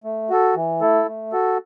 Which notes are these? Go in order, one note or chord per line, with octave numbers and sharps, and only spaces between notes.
A3
F#4 A4
E3
A3 E4 A4
A3
F#4 A4